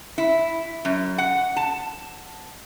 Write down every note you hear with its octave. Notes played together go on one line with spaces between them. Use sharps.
E4
F#2
F#5
A5